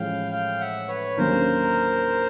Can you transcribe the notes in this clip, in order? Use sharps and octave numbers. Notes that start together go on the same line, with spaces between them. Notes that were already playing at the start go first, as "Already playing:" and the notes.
Already playing: A1 A2 F3 G#3 F5 G5
F5 G5
E5 F#5
B4 C#5
D#2 D3 F#3 A#3 C#4 A#4 C5